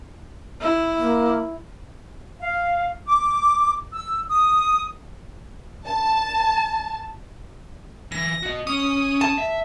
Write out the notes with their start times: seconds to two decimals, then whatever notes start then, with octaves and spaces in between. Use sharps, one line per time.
0.61 E4
0.98 A#3
2.40 F5
3.07 D6
3.92 E6
4.30 D#6
5.86 A5
8.12 E3 A#6
8.43 F#4 D#5
8.67 C#4 D#6
9.21 A5
9.38 E5